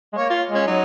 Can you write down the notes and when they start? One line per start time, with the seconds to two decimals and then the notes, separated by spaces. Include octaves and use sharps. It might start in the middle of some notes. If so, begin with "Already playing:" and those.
0.13 G#3
0.17 A#3 C#5
0.30 F4
0.50 G#3
0.55 C#4
0.67 F#3 D#4